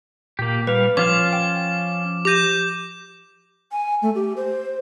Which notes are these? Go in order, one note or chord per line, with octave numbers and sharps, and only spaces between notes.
A#2 A#3 G4
G3 B4 F5
F3 C#4 F4 F5 D6
G5
G4 D6 G6 A#6 D#7
G#5
A3
G4
C5